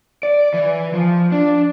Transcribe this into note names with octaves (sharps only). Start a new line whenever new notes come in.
D5
E3
F3
D4